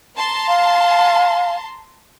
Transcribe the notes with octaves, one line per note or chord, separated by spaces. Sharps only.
A5 A#5 C6
F5